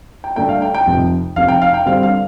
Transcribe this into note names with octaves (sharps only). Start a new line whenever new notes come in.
G5
G2 D3 A3 D4 G5
F5
G5
G5
F1 F2 C3
F1 F2 C3 F5
G5
F5
G5
G2 D3 G3 C4 F5
F5